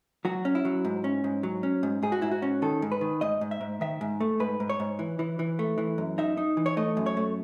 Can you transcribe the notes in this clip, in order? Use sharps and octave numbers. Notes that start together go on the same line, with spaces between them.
F#3 F#4
C#4
E4
F#3
G#2
C#4
G#2
F#3
C#4
G#2
G#2 G#4
F#4
G#2 E4
F#4
C#4
D#3 A4
G#2
B4
D#3
G#2 D#5
G#2
E5
G#2
D#3 E5
G#2
A3
G#2 B4
G#2
C#5
G#2
E3
E3
E3
A3
E3
F#2
D#4 E5
D#4
E3
C#5
A3 D#5
F#2
C#5
A3